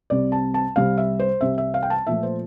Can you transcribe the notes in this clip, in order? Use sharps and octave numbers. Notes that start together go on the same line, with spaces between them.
C2 C3 G3 C4 D5
A5
A5
C2 C3 G3 C4 F5
E5
C5
C2 C3 G3 C4 E5
E5
F5
G5
A5
A#2 F3 A3 E5
C5